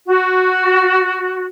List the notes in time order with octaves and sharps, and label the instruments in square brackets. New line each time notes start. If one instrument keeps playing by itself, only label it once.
[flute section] F#4